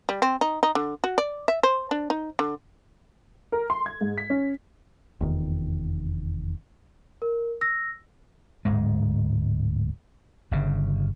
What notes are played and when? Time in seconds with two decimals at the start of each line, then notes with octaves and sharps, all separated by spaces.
0.09 G3
0.22 C4
0.41 D#4
0.63 D#4
0.75 D3
1.04 F#4
1.18 D5
1.48 E5
1.63 C5
1.91 D4
2.10 D#4
2.39 D3
3.52 A#4
3.70 C6
3.86 G#6
4.01 G#2
4.18 B6
4.30 C#4
5.21 F1 E2 D#3
7.22 A#4
7.61 E6 A#6
8.65 D1 D2 G#2 G#3
10.51 G1 G2 C#3